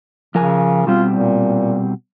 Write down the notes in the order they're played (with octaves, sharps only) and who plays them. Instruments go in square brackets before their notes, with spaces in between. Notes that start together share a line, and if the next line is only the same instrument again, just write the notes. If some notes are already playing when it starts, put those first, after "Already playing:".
[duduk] C#3 [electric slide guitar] F3 A#4 G#5
[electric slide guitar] B2 G3 C4 [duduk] F4
[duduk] A#2